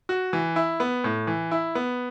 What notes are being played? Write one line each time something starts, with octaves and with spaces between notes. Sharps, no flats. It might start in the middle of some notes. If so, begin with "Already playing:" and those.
F#4
E3
E4
B3
A2
E3
E4
B3